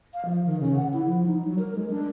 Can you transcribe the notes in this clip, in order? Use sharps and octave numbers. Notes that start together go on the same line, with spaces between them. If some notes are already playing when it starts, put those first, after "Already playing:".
F5
F3
D#3
C#3
F#5
E4
F3
D#4
F#3
A#4
G#3
D4